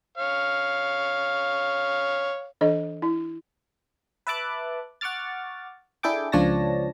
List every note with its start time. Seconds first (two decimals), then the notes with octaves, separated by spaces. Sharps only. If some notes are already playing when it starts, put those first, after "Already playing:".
0.18 C#5 F5
2.61 E3 D4 A4 D#5
3.02 E4
4.27 B4 E5 A5 D6 F#6
5.01 F#5 C#6 D6 F6 A6
6.03 D4 E4 G#4 A4 G5 D6
6.32 C#2 F3 D4 C#5 A5 A#6